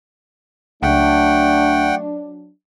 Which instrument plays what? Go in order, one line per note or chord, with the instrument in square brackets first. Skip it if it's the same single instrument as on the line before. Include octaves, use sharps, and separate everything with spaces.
[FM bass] C#2 [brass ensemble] F#3 D4 [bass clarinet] A3 [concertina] F#5 G5